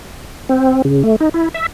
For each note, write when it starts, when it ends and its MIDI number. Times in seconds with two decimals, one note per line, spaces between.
0.49 0.82 60
0.85 1.03 49
1.03 1.16 57
1.20 1.29 63
1.34 1.49 64
1.54 1.66 76